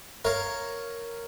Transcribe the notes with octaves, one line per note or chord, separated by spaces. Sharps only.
A#4 C#5 F5